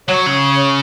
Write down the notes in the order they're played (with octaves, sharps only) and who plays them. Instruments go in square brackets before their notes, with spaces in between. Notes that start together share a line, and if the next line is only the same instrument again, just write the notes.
[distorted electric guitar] F#3 [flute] C#5
[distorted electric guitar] C#3